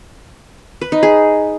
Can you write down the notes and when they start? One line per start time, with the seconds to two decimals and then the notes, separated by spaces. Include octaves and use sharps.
0.81 B4
0.92 D#4
1.03 G#4